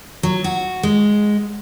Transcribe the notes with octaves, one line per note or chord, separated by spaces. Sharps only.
F#3
F#4
G#3